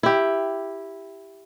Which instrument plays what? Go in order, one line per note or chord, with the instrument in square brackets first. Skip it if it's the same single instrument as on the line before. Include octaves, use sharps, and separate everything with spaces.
[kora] E4 G4